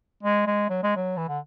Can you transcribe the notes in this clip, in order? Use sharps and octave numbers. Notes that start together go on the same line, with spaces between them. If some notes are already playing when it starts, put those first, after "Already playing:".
G#3
G#3
F#3
G#3
F#3
E3
D3